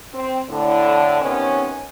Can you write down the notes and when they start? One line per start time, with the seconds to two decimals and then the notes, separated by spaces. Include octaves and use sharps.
0.13 C4
0.49 A2 D3
1.21 C3 D#3 B3 C#4